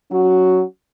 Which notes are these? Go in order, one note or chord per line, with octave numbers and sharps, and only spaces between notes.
F#3 C#4 F#4